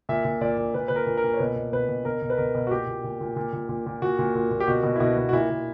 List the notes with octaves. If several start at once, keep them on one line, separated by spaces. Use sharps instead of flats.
A#2 E5
A#2
A#2 D5
A#2
A#2 B4
A#2 B4
A#4
A#2
A#4
A#2
C#5
B2 B4
B2
B2 B4
B2
B2 A#4
B2
B4
B2 A#4
B2
F#4
A#2 G4
A#2
A#2
A#2
A#2
A#2
A#2
A#2
A#2 F#4
A#2
A#2
A#2
G4
B2 F#4
B2
E4
B2 F#4
B2
F#4
A#2 E4
A#2